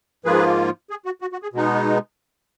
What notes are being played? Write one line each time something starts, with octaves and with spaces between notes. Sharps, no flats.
G#2 F3 A#3 F4 G#4 B4
G#4
F#4
F#4
F#4
G#4
B2 G#3 B3 D#4